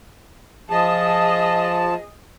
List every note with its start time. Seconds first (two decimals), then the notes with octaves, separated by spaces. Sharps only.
0.70 F3 G#4 D#5 A5